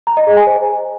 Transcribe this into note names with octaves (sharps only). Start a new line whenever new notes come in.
A#5
D#5
G#4
G#5
C5